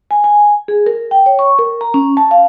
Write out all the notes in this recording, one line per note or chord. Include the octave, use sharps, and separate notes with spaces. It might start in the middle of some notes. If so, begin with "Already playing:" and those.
G#5
G#5
G#4
A#4
G5
C#5
C#6
A#4
A#5
C#4
A5
F5